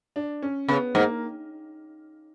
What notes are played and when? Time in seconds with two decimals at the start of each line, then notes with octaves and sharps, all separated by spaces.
0.16 D4
0.43 C#4
0.68 C#3 B3
0.95 G#2 A#3